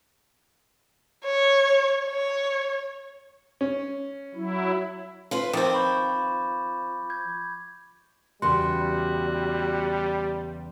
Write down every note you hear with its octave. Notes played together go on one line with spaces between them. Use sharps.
C#5
C#5
C#4
F#3 E4
F4 B4 C5
D#3 F3 C4 D6 A6
B5 C#6 G6
G6 G#6
E2 C#3 G3 F#4 C6